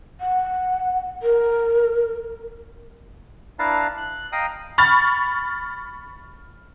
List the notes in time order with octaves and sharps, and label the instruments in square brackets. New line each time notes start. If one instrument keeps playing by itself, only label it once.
[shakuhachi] F#5
A#4
[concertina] D4 E4 B4 F5 A5 A#5
F#6
D#5 F5 G5 A#5 D#6
[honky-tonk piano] B5 C#6 F6 A6